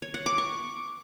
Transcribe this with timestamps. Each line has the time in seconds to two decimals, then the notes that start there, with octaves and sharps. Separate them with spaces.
0.02 C#5
0.14 F#5
0.26 D6
0.38 C#6